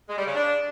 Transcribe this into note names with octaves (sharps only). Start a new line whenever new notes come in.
G#3
G3
C#3
D4